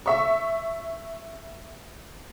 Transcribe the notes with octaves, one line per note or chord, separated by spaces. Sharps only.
E5 C#6